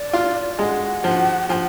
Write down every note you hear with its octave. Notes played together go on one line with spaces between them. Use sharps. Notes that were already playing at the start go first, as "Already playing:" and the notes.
Already playing: D5
F4
G#3 F#5 G#5
F3
F3 F#5 G#5